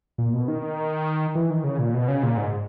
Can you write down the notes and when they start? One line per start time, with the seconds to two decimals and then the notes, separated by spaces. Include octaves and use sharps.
0.18 A#2
0.33 B2
0.48 D#3
1.35 E3
1.50 D#3
1.64 C#3
1.79 A#2
1.94 B2
2.08 C#3
2.23 A#2
2.37 G#2